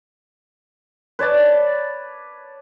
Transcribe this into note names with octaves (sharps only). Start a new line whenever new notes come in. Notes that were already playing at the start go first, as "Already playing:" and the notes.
B4 C#5 D5 A5